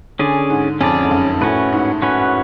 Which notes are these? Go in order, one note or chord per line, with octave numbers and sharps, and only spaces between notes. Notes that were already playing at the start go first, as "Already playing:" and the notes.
D3 C#4 G#4 D5
G#2
F2 C#4 G#4 D5
F2
F#2
A2 C#4 F#4 B4
G#2
C#4 F#4 B4